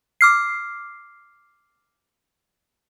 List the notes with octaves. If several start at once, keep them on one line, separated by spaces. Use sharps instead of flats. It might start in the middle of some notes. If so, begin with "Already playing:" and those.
D6 F6 C7